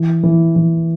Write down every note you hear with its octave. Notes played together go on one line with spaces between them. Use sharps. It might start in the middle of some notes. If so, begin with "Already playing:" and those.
Already playing: E3
E3
E3